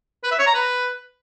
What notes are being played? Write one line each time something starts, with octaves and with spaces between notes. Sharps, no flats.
B4
E5
C#5
A#5
B4